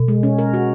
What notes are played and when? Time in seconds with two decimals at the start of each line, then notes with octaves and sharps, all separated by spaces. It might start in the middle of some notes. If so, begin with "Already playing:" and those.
Already playing: B2
0.08 G#3
0.23 C#4
0.38 A#4
0.54 F#4